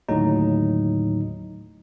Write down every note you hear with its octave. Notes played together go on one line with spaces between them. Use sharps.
D#2 A2 D3 F#3 D#4